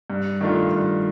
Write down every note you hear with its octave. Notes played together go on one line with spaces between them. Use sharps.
G2
D#3 A3 D4 F4
G2